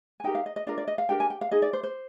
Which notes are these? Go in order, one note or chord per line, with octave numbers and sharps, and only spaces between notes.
G#5
D#4 G4 A#4 G5
F5
D#5
D#5
D4 F4 A#4 D5
D5
D#5
F5
D4 G4 A#4 G5
G#5
G5
F5
D#4 G#4 D#5
D5
C5
C5